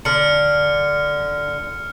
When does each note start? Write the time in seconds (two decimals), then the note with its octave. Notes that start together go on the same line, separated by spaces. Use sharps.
0.05 D3 F6 C#7